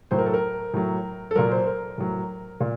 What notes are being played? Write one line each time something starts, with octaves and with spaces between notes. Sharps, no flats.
A2 F#3 C5
A#4
A4
A#4
A2 F#3
A4
A#2 F#3 A#4
C5
A#4
A2 F#3
A#2